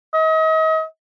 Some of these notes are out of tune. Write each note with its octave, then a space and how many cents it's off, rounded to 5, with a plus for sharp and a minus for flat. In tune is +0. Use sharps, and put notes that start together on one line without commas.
D#5 +40